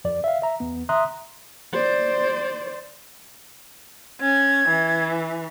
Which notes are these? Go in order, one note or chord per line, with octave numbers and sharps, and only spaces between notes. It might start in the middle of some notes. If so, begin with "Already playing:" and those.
F2 D5
E5 F5
E5 A#5
E2 B3
E5 A#5 C6 D#6 F#6
C5 D5
C#4 G#6
E3